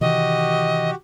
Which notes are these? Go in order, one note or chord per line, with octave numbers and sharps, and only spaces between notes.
C3 D#3 E3 F#4 G4 D#5